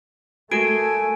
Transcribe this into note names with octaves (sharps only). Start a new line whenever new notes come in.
A3 F#4 A4 A#4 G#5 D7